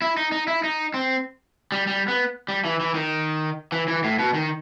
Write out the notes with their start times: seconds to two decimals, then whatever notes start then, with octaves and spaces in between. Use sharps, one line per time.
0.02 E4
0.17 D#4
0.32 D#4
0.48 E4
0.64 D#4
0.94 C4
1.72 G3
1.87 G3
2.08 B3
2.48 G3
2.65 E3
2.80 E3
2.95 D#3
3.72 E3
3.88 E3
4.04 A2
4.19 B2
4.34 D#3